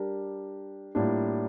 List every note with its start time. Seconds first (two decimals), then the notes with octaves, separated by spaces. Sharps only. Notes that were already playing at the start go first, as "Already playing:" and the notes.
Already playing: G3 D4 G4 A#4
0.95 A2 G3 A#3 D4 F4